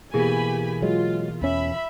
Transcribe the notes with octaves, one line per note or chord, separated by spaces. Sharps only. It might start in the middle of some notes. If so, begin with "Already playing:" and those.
B2 E3 A#3 G4 G#4 G#5 B5
F#3 G#3 F4
E2 C#4 E5 B5